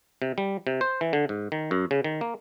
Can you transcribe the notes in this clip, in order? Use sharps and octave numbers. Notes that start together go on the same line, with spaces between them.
C3
G3
C3
C5
E3
D3
G#2
D#3
F#2
C#3
D#3
A#3